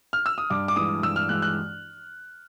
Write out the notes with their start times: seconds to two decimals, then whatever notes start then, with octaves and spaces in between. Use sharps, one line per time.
0.13 F6
0.26 E6
0.38 D#6
0.50 G2 D6
0.68 D6
0.76 E3 G#3 D#6
1.02 G2 E6
1.16 F6
1.29 E3 G#3 F#6
1.42 F#6